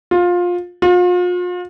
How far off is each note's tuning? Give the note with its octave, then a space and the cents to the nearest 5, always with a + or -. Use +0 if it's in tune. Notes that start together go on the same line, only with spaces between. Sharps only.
F4 +20
F4 +40